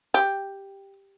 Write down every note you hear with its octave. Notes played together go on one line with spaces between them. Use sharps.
G4